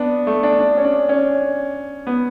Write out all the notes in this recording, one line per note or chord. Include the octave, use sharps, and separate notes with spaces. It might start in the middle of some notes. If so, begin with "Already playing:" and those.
Already playing: B3 D4
A3
D4
D4
C#4
D4
C#4
B3